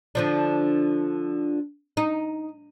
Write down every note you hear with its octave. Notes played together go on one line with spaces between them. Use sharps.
D3 F3 D4
D#4